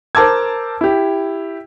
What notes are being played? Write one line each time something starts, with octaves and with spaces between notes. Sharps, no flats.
A#4 C5 A5 D6 E6 G#6
E4 G4